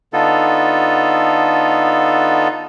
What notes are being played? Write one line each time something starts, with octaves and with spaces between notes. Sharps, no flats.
D3 B3 D#4 F4 A4